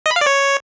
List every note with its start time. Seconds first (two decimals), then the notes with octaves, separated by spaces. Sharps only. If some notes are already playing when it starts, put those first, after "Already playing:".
0.06 D#5
0.11 B5
0.16 F5
0.21 D5
0.27 C#5